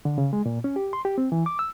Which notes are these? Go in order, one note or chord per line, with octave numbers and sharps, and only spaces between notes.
D3
C#3
G#3
A#2
C#4
G4
C6
G4
C4
E3
D6
E6